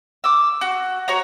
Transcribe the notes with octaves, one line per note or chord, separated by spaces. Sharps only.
D6 E6
F#4
F#4 C#5 A#5